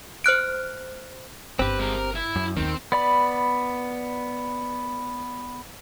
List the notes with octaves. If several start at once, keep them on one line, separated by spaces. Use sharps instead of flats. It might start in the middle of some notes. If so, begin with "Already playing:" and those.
C5 F6 F#6 D7
G1 C4 G4 B4
G#3 A#4
A#4
E4
F#2
D#2 D#3 B3 C4
B3 D5 B5